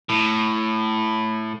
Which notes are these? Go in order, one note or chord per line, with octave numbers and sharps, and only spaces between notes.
A2